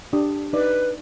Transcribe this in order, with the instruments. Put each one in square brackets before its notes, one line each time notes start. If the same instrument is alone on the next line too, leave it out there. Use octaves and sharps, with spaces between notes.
[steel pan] D4 G4 D#6
[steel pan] D#4 D5 [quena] B4